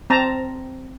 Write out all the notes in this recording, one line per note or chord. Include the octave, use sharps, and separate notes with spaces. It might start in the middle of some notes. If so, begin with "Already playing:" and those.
C4 A5 A#5